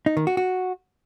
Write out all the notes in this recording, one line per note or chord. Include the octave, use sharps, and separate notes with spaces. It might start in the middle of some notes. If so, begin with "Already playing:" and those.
D#4
D#3
F#4
F#4